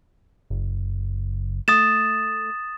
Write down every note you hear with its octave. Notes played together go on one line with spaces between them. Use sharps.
F#1
A3 D#6 A6 E7